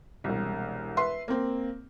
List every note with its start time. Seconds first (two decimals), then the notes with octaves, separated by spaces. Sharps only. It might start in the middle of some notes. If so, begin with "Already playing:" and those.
0.24 E1 C2
0.97 B4 E5 C6
1.28 A#3 C4